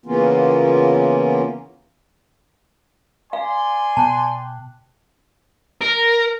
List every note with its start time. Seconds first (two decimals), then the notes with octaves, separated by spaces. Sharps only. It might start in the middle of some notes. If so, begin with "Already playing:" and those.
0.06 C#3 E3 A#3 B3 C#4 F4
3.33 D5 F5 G#5 C6
3.97 B2 G5 A5 F#6
5.82 A#4